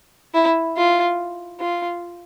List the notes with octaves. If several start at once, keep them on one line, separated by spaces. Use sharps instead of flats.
E4
F4
F4